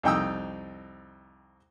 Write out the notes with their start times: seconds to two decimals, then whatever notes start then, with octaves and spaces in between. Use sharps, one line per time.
0.03 C2 F2 D#4 G5 D#6 E6